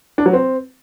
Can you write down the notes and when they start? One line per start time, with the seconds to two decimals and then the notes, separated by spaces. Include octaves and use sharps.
0.18 D4
0.26 F#3
0.33 C4